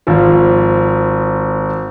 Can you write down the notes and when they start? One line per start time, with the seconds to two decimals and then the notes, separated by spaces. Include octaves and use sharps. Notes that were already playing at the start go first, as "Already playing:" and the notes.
0.07 G#1 F3